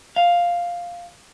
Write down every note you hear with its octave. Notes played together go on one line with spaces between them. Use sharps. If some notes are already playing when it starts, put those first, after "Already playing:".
F5